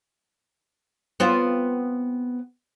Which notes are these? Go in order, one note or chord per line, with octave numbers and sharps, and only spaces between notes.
B3 C4 F4